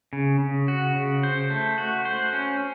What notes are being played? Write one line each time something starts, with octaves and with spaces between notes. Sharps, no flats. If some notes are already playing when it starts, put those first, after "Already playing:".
C#3
C#3
F#4
C#3
C5
A3
F#4
C5
C#4